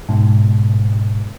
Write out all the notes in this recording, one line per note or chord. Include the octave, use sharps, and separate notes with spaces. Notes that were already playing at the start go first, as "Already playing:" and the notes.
G#2 B2